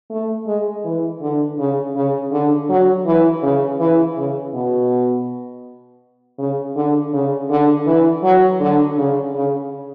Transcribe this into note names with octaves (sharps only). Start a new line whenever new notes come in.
A3
G#3
E3
D3
C#3
C#3
D3
F#3
E3
C#3
E3
C#3
B2
C#3
D3
C#3
D3
E3
F#3
D3
C#3
C#3